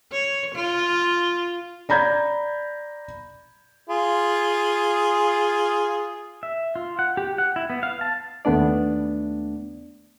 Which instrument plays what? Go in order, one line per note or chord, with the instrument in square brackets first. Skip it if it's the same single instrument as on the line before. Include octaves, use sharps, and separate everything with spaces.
[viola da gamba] C#5
F4
[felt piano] D5 A#5 B5 G6 G#6
[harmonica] F4 G#4
[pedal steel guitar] E5
F4
F#5
G4
F#5
E4
B3
F5
A5
[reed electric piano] D#2 A3 B3 D4 D5